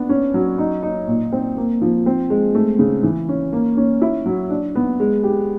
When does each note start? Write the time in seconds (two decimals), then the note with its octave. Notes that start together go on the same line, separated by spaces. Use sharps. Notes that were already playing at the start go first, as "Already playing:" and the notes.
Already playing: B3 D4
0.09 C#4
0.34 F#3
0.58 D#4
0.83 D#4
1.07 A#2
1.32 C4
1.57 A#3
1.81 F3
2.06 C4
2.30 G#3
2.55 A3
2.79 C#3
3.03 E3
3.29 C#4
3.53 A#3
3.77 C#4
4.02 E4
4.26 F#3
4.50 D4
4.75 B3
5.00 G#3
5.23 G4